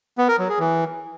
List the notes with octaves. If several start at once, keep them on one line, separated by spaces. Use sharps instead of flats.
B3
A#4
F#3
G#4
E3